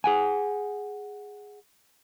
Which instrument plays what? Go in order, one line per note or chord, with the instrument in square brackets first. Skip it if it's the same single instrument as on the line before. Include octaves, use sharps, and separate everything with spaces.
[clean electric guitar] G#4 F#5 G#5